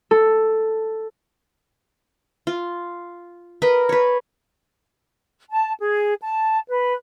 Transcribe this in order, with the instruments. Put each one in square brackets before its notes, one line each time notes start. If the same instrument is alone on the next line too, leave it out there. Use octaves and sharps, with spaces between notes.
[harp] A4
[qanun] F4
A#4 B4 D#5
B4 C#5
[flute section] A5
G#4
A5
B4